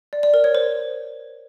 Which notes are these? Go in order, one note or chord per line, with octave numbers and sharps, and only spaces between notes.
D5
D5
A#4
C#5
C5